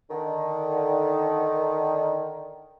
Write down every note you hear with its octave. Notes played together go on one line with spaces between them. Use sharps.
D3 D#3